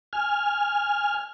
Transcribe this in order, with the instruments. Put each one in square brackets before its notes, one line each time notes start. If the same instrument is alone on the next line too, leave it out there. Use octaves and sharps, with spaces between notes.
[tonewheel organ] G#5 F6